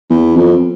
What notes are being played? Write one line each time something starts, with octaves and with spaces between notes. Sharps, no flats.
E2
F2